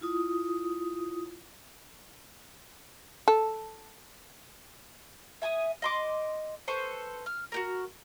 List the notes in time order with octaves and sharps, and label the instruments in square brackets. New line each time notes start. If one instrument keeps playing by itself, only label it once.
[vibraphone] E4 F4 D#6
[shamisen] A4
[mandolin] E5 G#5 D6 D#6
D#5 C6 D6
A4 B4 C5 C#6
F6
F#4 G4 A#4